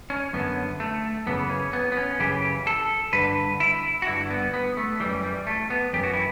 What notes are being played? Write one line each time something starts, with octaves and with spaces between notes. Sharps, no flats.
C#4
F#2 D3 B3
A3
F#2 C#3 E3 B3
C#4
B3
B3
C#4
F#2 C#3 E3 G4
A4
G2 D3 B4
E4
F#4
G2 D3 E4
B3
B3
A3
F#2 E3 G3
G3
A3
B3
F#2 E3 G4
F#4
E4